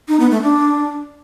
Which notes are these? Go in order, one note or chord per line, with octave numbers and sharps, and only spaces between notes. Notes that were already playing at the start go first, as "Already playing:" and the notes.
D#4
B3
A3
D4